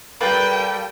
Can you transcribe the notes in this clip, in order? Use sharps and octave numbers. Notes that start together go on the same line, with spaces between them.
G3 A#3 A4 B4 G5